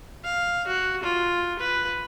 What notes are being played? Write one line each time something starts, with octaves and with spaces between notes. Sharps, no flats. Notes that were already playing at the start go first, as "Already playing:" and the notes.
F5
F#4
F4
B4